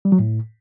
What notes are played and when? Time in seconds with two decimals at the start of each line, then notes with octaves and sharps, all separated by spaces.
0.05 G3
0.12 F#3
0.19 A2